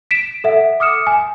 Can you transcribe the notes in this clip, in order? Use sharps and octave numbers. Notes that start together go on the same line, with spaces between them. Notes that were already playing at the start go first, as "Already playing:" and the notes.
B6 D7 E7
A4 E5 F#5
D6 D#6 F6 C#7 E7
G#5